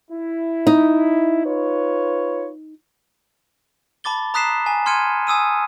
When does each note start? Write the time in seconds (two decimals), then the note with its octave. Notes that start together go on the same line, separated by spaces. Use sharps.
0.11 E4
0.67 D#4
1.46 F4 B4 C#5
4.04 A5 B5 D6 A6 G7
4.34 A#5 D#6 F#6 B6 C7 E7
4.66 G#5
4.86 C6 F6 G#6 C#7 D#7
5.27 G#5 D#6 E6 D#7